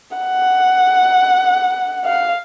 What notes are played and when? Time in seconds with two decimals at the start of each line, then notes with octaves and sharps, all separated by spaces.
0.17 F#5
2.05 F5